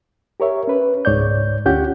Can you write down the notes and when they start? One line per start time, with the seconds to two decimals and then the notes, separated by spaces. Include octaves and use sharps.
0.40 G4 A#4 C#5 E5
0.68 C#4 B4
1.05 C#2 G#2 C#5 D5 G6
1.66 D2 C#4 F4 G4 F#5 G6